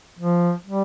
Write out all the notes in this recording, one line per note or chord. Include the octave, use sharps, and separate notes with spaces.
F3
G3